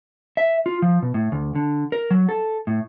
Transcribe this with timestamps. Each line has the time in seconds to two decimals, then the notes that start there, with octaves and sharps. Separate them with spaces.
0.37 E5
0.66 F4
0.82 F3
1.02 B2
1.14 A2
1.32 D2
1.55 D3
1.92 A#4
2.11 F#3
2.29 A4
2.67 A2